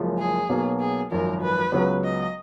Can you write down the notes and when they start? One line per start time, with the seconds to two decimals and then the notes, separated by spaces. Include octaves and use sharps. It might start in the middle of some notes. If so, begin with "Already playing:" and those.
Already playing: F#1 F#2 F3 G#3
0.19 G#4
0.49 B1 B2 F#3 A#3
0.79 G#4
1.11 G#1 F#2 F3 A#4
1.42 B4
1.72 C#2 C#3 F#3 B3
2.04 D#5